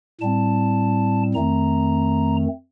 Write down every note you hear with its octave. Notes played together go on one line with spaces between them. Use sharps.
A2 G3 C4 A5
F2 D#3 A3 C4 A#5